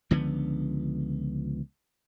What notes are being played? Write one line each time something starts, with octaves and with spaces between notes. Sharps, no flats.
C#2 D3 F3 B3